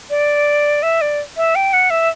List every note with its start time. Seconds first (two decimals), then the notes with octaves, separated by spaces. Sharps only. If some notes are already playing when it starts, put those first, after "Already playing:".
0.10 D5
0.83 E5
1.01 D5
1.37 E5
1.55 G5
1.73 F#5
1.90 E5